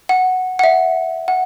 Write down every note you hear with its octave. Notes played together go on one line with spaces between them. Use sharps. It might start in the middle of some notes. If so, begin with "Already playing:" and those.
F#5
F#5
E5
F#5